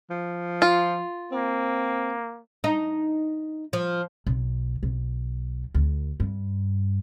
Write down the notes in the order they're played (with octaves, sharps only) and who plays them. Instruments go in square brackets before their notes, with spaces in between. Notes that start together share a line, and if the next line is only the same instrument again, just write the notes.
[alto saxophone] F3
[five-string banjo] F4
[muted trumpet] A#3 [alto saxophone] C4
[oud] D#4
F3
[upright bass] B1
B1
D2
G2